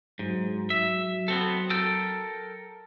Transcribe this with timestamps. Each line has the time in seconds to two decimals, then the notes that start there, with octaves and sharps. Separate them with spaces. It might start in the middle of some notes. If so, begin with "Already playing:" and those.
0.19 G#2 F#3
0.70 E5
1.28 B3 C4 A4
1.70 A4 A#4 G5